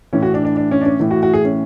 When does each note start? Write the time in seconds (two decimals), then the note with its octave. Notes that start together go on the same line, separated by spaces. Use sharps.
0.13 A2 E3 C#4
0.23 F#4
0.34 D4
0.45 D4
0.57 D4
0.71 C#4
0.81 D4
0.86 C#4
1.00 A2 E3
1.11 F#4
1.23 F#4
1.33 G#4
1.45 C#4